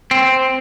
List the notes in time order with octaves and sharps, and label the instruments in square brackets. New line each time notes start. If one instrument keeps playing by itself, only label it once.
[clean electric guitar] C4